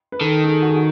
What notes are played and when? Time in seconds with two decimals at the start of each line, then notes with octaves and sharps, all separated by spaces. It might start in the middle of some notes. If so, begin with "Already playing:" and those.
0.12 B4
0.20 D#3 A4
0.44 A4
0.48 G#4
0.62 F#4
0.70 G#4
0.76 F#4